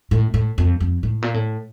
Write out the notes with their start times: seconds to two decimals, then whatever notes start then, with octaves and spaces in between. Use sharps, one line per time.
0.11 A2
0.34 A2
0.58 F2
0.80 F2
1.03 A2
1.22 A#2
1.34 A2